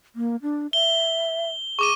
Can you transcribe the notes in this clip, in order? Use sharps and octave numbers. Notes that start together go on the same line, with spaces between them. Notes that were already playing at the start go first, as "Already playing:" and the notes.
A#3
D4
E5 G7
G#4 C#6 D6 D#7